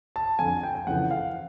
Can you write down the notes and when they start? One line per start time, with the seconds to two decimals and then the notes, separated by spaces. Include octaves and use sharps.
0.16 A5
0.39 F2 D3 G#5
0.63 G5
0.75 G5
0.87 F2 C#3 E3 F#5
1.11 F5